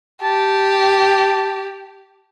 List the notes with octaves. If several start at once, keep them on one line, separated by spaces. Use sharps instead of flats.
G4 A5